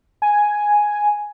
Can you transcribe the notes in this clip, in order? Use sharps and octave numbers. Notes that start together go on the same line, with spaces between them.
G#5